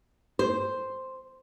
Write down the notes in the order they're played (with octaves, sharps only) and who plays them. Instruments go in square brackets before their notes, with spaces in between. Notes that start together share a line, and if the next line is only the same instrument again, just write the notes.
[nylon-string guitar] C5